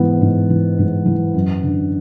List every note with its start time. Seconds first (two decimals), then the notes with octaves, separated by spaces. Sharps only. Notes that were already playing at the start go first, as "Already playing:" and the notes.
Already playing: G#2 E3 B3
0.22 G#2
0.50 E3
0.79 G#2
1.06 E3
1.34 F#2
1.63 D3